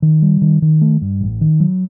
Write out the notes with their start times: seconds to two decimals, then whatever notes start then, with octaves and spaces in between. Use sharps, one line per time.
0.02 D#3
0.22 G3
0.42 D#3
0.62 D#3
0.81 A3
1.01 G2
1.21 A1
1.41 D#3
1.60 F#3